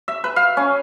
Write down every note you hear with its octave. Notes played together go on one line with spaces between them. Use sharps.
E5
B4
F5
C#4